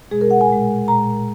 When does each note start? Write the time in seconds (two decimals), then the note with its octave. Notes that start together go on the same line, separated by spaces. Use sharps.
0.11 B2 G#3 G#4
0.21 A#4
0.31 F#5
0.41 G#5
0.50 A#2 G#3
0.88 A#2 G#3 A#5